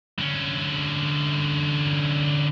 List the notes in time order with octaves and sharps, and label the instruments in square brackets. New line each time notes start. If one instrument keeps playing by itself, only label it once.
[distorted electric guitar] D3 C#4